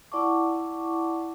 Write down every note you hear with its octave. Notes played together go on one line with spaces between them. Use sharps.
E4 D5 F#5 A5 C#6 D6